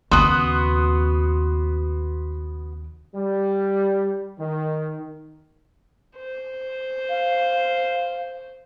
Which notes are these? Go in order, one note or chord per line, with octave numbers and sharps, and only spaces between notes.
D#2 C#3 B3 F#4 C6 D#6 F#6
G3
D#3
C5
F5